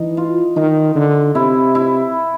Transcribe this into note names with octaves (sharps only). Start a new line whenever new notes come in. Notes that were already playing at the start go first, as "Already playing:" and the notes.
Already playing: E3 D#4
F4
D#3 D#4
D3
C3 E4
E4